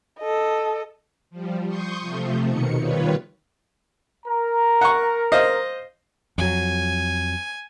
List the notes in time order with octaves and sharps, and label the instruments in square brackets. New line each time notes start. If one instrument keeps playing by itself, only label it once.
[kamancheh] A4 D#5
[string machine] F3 G3
C6 C#6 D#6 G6
C3 F3 A3
D#2 B2 D#3 C#7
D#3 G3 F4 B4 C#5
[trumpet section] A#4 A#5
[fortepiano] F#5 C#6
C5 D#5 F5
[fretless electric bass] F2 F#3 [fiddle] G#5